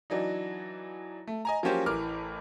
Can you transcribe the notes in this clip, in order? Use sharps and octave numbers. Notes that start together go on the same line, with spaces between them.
E3 F#3 D4 D#4
A3
D#5 G#5 A#5
F3 F#3 A#3 C#4 G4 C5
A1 E3 A#4 D6 F6